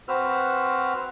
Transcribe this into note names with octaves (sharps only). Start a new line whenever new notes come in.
C4 F#4 B4 C5 E6 F6